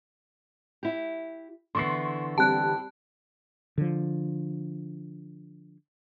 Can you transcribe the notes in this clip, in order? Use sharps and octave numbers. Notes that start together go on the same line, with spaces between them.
E4 G4
D3 E3 B3 C6 C#6 C7
G3 C4 G4 A5 F#6
D3 F3